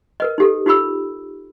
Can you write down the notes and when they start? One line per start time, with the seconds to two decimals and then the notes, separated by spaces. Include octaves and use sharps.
0.20 A#4 B4 D#5
0.38 D#4 G4 A4
0.66 D#4 F4 G4 B5 E6